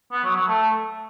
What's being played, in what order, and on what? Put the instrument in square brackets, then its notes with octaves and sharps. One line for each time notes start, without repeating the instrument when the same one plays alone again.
[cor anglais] B3
F#3
F#3
A3